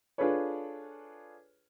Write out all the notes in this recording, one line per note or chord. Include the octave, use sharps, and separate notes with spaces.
D4 F4 G#4 A4 B4 C#5